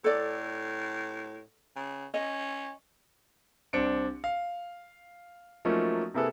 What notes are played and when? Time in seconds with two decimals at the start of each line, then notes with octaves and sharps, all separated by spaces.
0.04 A2 A4 D5
1.76 C#3
2.14 C#4 D#5
3.73 C2 C4 D4 C#7 D7
4.24 F5
5.65 F3 F#3 A3 A#3 C#4 D#4
6.14 C3 A#3 E4 G#4 A4 B4